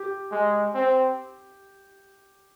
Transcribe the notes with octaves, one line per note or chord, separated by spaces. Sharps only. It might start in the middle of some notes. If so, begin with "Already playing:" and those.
Already playing: G4
G#3
C4